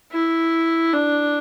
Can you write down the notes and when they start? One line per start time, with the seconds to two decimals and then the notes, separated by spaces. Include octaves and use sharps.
0.12 E4
0.93 D4